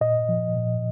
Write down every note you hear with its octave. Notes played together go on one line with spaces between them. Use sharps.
A#2 D#5
F3
A#2